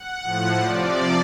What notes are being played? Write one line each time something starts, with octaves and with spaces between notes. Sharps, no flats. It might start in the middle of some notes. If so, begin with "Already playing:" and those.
Already playing: F#5
A2 F3
C3 F3 D5